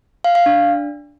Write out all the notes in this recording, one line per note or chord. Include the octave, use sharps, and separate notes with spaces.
F5
F5
D4